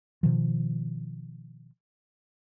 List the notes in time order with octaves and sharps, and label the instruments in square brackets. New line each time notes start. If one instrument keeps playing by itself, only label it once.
[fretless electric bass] B2 D#3 F3